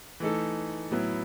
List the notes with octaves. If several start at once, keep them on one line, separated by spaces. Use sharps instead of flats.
E3 A3 D#4 A4
A2 F#3 B3 E4